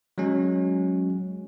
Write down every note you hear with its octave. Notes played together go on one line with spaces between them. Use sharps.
F#3 G#3 C#4